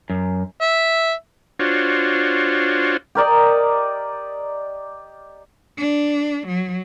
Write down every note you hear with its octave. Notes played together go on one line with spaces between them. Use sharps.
F#2
E5
D4 F4 F#4 C5 C#5
G4 A#4 D5 D#5
D4
F#3